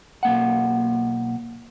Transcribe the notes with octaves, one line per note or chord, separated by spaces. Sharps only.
B1 A#3 F#5